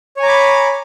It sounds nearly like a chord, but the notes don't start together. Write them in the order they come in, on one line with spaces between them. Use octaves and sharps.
C#5 G#5 A#5 D6 B5